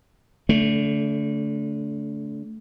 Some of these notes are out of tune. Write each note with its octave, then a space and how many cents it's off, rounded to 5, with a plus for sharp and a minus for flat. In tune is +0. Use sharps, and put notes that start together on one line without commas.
D3 -30 A3 +0